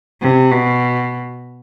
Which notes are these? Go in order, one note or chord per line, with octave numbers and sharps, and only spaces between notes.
C3
B2